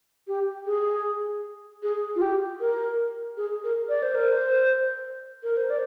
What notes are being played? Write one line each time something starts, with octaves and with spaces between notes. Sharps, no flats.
G4
G#4
G#4
F4
G4
A#4
G#4
A#4
D5
C5
A#4
C5
A#4
C5
D5